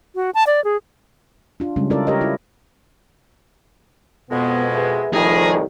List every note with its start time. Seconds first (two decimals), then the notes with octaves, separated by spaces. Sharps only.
0.15 F#4
0.35 A5
0.47 D5
0.64 G#4
1.60 D4 F4
1.76 C#3 G3 G#3 C#4
1.90 C#4 E4 F4 A4 A#4 D5
2.07 G4 A#4 C#5 D#5
2.21 E4 F4
4.30 F2 B2 G#3 B3
4.75 G#4 B4 E5
5.13 C2 A2 D#3 F3 G3 G#4 A#5